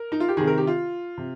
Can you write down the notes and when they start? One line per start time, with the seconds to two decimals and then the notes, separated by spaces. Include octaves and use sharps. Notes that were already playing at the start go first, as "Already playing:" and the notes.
Already playing: A#4
0.12 D#4
0.20 F4
0.28 G4
0.37 C3 D#3 G#4
0.47 A#4
0.57 G4
0.67 F4
1.18 C3